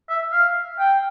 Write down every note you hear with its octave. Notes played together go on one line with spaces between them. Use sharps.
E5
F5
G5